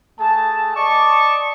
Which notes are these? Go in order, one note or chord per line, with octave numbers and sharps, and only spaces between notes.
A3 G#4 A5
D5 D#5 A5 C#6 D6